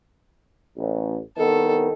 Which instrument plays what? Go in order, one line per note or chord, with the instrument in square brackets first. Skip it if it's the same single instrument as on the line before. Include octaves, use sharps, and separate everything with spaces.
[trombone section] A1
[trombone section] C2 D#3 B3 [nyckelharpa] A4